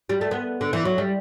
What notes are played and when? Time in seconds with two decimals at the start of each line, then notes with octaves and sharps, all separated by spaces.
0.09 G3
0.21 A3
0.31 B3
0.61 D3
0.73 E3
0.85 F#3
0.98 G3